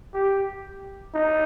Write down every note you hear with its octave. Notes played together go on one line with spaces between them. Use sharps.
G4
D#4